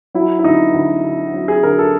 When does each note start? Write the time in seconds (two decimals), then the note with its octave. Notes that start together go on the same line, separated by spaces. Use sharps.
0.15 F#3 E4
0.39 E4
0.44 D2 D#4
0.74 D2
1.04 D3
1.34 F#3
1.48 G#4
1.63 D2 A#4
1.79 A4